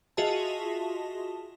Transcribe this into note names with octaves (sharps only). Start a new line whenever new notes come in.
F4 F#4 G#4 D#5 E5 A5